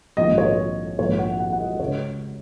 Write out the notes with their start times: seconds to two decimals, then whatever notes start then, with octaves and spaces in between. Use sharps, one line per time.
0.17 A#1 G#2 D#3 D#5
0.38 C#5
0.98 A#1 G#2 D#3 C#5
1.19 F#5
1.39 F#5
1.52 F#5
1.60 D#5
1.79 C#2 C#3 C#5